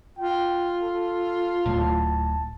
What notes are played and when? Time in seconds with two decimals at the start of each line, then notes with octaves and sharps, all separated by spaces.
0.18 F4 G5
0.80 A4
1.66 D1 A2 A5